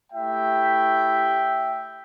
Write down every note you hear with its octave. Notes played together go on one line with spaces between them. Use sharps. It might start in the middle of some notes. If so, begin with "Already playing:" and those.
A3 E4 G4 E5 G5